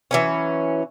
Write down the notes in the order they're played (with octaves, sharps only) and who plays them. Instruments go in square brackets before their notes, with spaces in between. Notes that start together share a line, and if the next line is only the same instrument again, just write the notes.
[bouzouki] E3 F#3 C#4